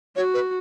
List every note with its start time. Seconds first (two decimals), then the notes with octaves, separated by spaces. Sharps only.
0.16 F#4 C#5
0.34 B4